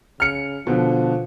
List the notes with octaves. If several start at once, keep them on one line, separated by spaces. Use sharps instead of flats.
C#3 F6 C#7
B2 D3 F3